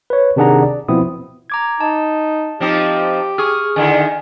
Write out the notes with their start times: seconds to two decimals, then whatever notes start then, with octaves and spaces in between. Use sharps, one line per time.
0.10 B4 C#5
0.36 C3 D#3 D4 G#4 F#5 A#5
0.63 D5
0.88 B2 F3 B3 C4 E4 D#6
1.50 A#5 D6 G#6
1.81 D#4 A5
2.60 F3 C4 D#4 G4
3.38 G#4 C#6 D#6 F6
3.76 D3 D#3 E4 G#5